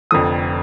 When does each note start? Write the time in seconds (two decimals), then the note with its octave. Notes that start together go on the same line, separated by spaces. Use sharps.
0.11 F1 F2 D3 F3 D#6